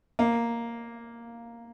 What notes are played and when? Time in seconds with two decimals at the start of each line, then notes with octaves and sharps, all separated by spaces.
0.19 A#3